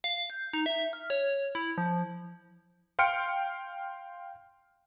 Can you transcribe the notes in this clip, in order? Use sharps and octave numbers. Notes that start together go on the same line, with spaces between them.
F5
G6
D#4
E5
F6
C#5
E4
F3
F5 G5 C6 F6 C#7 D7